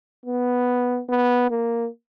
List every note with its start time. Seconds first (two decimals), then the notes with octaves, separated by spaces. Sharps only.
0.26 B3
1.09 B3
1.50 A#3